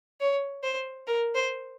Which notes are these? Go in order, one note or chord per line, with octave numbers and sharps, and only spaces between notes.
C#5
C5
A#4
C5